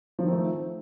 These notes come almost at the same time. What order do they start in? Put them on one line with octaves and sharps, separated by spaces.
F3 D#3 C4 A3